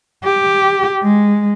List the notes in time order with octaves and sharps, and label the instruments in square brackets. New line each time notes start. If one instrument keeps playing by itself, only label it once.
[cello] G4
G#3